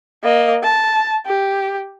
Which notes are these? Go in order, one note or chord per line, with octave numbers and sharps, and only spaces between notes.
A#3 D#5
A5
G4